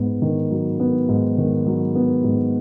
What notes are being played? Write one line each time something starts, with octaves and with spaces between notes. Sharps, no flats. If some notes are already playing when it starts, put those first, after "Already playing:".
Already playing: G#2 B3
D#3
F#3
B3
G#2
D#3
F#3
B3
G#2